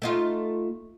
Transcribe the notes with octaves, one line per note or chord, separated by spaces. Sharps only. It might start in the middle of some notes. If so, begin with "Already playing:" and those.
A3 D#4 F4